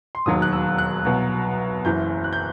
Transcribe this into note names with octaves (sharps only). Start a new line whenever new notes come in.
C6
E1 D#2 D#3 F#3 D#6
F#6
E6
F#6
C2 B2 F#3
F#1 F#2 E3 G6
F#6
G6